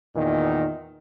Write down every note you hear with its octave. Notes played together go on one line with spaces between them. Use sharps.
E2 A#2 D#3